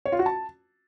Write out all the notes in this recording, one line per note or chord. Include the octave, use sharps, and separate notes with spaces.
C#5
F4
F#4
A5